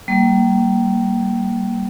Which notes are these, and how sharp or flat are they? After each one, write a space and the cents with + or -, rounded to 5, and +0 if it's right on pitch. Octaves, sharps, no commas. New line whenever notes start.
G3 -25 A#3 +0